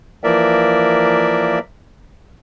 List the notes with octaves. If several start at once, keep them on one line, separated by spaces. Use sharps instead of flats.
E3 F3 A#3 A#4 D5 E5